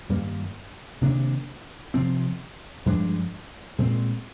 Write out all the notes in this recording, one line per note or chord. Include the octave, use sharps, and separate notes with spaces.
G2 D#3 G3 A#3
C3 D#3 A#3 D4
C3 F3 C4
G2 F3 G#3 D4
A#2 G#3 C4